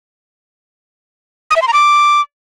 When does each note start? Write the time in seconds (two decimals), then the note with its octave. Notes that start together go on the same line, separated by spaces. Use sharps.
1.51 D#6
1.56 E5
1.62 C6
1.68 A#5
1.73 D6